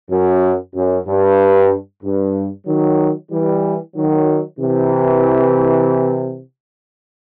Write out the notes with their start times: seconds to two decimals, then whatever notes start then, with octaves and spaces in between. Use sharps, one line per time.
0.10 F#2
0.75 F#2
1.07 G2
2.03 G2
2.67 D#3 F#3
3.31 E3 G3
3.95 D#3 F#3
4.59 C3 E3